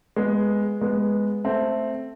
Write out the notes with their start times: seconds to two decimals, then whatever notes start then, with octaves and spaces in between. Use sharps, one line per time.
0.16 G#3 B3
0.81 G#3 B3
1.44 A3 C4